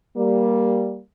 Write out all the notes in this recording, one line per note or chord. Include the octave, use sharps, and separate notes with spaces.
G3 A#3